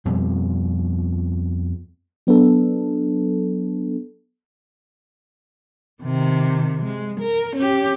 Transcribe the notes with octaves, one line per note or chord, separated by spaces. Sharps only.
F2 B2 G3 C4
F#3 B3 D4 A4
C3 D#3
G#3
A#4
C#4 G4